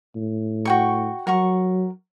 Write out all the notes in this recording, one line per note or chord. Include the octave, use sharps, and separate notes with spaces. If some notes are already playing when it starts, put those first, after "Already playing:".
A2
F#4 G5 C#6
F#3 A#4 F#5 C#6